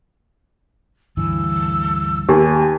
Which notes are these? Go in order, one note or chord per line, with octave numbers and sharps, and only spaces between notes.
D2 G2 E3 E6
D#2 G4 G#5